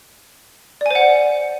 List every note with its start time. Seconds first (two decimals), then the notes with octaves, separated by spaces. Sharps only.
0.81 D5
0.86 G#5
0.91 C5
0.95 F#5